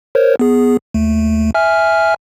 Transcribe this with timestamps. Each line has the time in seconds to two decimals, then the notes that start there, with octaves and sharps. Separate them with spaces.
0.15 A#4 C5 C#5
0.39 B3 G#4
0.94 D#2 A3
1.54 E5 G#5 F6